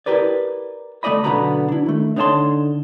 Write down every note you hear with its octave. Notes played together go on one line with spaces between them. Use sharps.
E4 G4 A#4 B4 D5
D2 A3 F#4 D5 D#5 B5
B1 D3 B3 F#4 A#5 B5
D4 E4
D#3 A3
D3 D#4 C#5 F5 A5 C6